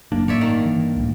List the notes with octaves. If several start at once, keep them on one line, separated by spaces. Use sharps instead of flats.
F#1 A#3 D4
A1 G2 A#3 C#5 D5 E5
D#3
E3
C#2 A2